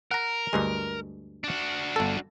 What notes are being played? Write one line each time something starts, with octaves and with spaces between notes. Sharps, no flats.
A#4 F#5 A#5
D2 G2 G#3
D4 F#4
G1 A4